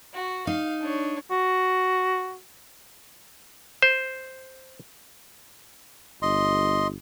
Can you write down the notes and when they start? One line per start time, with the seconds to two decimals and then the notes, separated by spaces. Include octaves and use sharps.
0.14 F#4
0.47 D#4 F5
0.81 D4 C#5
1.31 F#4
3.82 C5
6.22 G1 D#5 C6